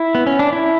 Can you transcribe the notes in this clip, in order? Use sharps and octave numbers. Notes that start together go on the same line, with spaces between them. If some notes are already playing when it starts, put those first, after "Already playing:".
Already playing: E4
B3
C#4
D4
E4